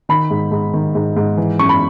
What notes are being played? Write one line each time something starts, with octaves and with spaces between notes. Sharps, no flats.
D#3 B5
G#2
G#2
D#3
G#2
G#2
E3
F#2 C#6
B5